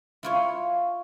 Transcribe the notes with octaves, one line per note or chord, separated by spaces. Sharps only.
E4 F4 C#5